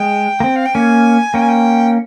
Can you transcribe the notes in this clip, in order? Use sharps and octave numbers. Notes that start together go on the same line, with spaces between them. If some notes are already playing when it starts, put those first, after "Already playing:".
Already playing: G#3 G5
A#3
C4
F5
G5
A#3 C#4 G#5
A#3 C#4 G5
G#5
G5